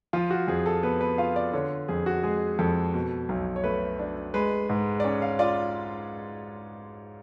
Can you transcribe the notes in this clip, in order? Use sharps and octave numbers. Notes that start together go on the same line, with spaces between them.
F3 F4
F#4
F2 G#4
A4
B3 B4
B4
F4 F5
D5
D3 C#5
F2 G#4
F#4
G#3 G#4
F2 A4
B2
B1
C#5
A3 B4
D4
G#3 B4
G#2
D5
C#4 C#5
F5
F4 D5